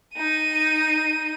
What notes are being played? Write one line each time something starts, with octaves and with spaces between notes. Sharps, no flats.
D#4 D#7